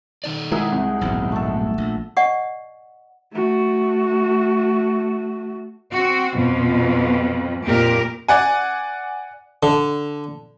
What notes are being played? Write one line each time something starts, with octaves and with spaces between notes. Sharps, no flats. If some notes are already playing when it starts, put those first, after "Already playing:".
D#3 D#4 D5
G#3 E4 G#4 A#4 F#5
C2 C4
D#1 B1 G#2
A3 A4
A#1
D5 D#5 F#5 G#5 C#6
A3 F#4
C4 F#4
F2 B2 F3
F2 A#2 G4 A#4
D5 F#5 G#5
D3